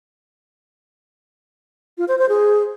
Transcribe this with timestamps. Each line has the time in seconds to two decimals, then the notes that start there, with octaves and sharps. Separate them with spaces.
1.98 F4
2.08 C5
2.19 C5
2.29 G#4